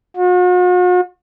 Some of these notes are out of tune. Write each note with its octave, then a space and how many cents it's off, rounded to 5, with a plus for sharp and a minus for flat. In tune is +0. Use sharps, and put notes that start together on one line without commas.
F#4 -45